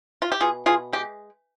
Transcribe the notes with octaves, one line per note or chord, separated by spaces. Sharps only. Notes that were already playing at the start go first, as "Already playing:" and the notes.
F4
G4
B2 F4 G#4
B2 F4 G#4
G#3 G4